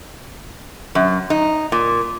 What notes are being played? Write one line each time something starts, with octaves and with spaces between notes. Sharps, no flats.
F#2
D#4
A#2